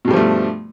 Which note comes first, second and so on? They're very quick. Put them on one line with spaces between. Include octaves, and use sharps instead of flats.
B2 G2 G3 F3 A3